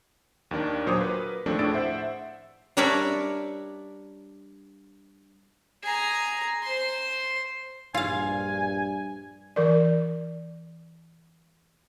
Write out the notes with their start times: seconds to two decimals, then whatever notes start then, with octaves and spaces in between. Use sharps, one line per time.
0.51 D#2 D#3 D4 A#4
0.86 A#2 F#3 C5 C#5 D6 D#6
1.01 A#4 B4
1.46 D#2 F3 A3 C4 D4
1.59 A2 D4 G#4 E6 A6 D7
1.73 C5 E5 F#5
2.77 G3 D4 A#4 C#5 D5 E5
5.83 G#4 A#5
6.63 C5 C6
7.94 A#1 G2 F4 F5 G#5
9.56 E3 A#4 D5